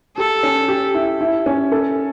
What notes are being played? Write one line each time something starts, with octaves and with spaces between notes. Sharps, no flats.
G4 A4
C#4
G4
E4
E4
C#4
A4